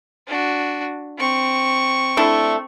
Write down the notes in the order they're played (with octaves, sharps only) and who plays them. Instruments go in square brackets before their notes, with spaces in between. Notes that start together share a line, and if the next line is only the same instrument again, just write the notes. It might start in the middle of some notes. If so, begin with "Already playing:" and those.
[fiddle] D4 F#4
C4 C#6
[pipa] A3 D4 E4